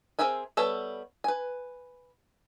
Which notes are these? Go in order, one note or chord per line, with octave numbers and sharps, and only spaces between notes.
C4 G#4 A#4 E5 G#5
G3 B3 A4 C#5 E5
B4 G#5